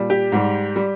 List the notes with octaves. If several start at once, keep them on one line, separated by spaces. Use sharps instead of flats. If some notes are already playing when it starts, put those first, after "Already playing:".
Already playing: A#2 G3
G4
G#2 G3
G3